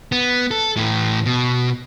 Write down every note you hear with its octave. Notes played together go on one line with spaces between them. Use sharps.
B3
A4
A2 E3
B2